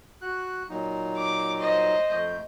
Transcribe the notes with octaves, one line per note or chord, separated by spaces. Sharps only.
F#4 F#6
A#2 F#3 D#4
D6
C5 D#5
F2 A3 G6